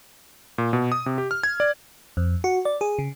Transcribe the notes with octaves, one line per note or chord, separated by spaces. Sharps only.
A#2
B2
D#6
C3
G4
F6
G#6
D5
F2
F#4
D5
G#4
C#3